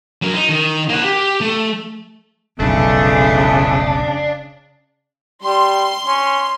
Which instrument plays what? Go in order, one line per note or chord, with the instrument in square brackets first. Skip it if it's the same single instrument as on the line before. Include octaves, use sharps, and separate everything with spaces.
[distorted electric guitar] F#3 A#4
D#4
D#3
A#3 F#5
G4
A3
[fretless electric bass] F1 B1 [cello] C#3 [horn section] E3 G#3 A3 [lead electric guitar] D4
[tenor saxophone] G3 [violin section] C6
[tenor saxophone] C#4